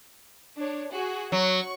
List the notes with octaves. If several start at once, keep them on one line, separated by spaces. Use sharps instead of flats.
D4 C#5
F#4 G#4
F#3 C#6